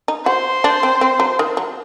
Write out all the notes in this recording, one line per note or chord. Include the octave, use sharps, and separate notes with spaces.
D#4
F#4 C5
D4
C4
C4
F#3
D#3
F#3